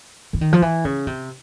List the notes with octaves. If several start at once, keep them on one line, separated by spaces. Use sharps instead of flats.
E3
D#3
F3
E3
C#3
C3